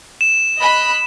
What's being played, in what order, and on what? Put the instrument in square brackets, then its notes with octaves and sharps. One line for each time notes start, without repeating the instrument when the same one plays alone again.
[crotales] E7
[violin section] D#5 B5 F#6